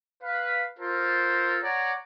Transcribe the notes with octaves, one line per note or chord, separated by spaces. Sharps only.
B4 F5
F4 A4 A#4 C5
C#5 D5 F#5 A#5